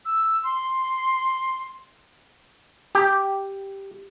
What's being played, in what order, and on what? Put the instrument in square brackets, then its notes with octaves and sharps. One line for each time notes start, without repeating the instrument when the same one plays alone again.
[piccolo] E6
C6
[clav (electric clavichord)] G4